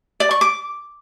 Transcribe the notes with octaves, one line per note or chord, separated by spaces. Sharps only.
D5
C#6
D6